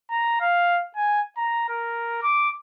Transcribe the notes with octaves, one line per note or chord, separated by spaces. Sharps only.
A#5
F5
G#5
A#5
A#4
D6